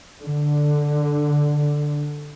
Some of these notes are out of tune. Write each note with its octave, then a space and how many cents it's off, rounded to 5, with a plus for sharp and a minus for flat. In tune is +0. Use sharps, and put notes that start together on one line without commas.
D3 +5